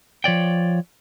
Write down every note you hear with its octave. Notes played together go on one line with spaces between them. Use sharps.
F3 C#5 D5 G5